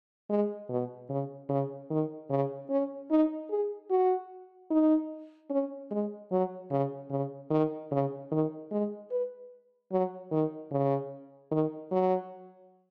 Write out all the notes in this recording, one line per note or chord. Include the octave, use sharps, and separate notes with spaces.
G#3
B2
C#3
C#3
D#3
C#3
C#4
D#4
G#4
F#4
D#4
C#4
G#3
F#3
C#3
C#3
D#3
C#3
D#3
G#3
B4
F#3
D#3
C#3
D#3
F#3